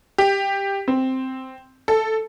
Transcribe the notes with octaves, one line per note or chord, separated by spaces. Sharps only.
G4
C4
A4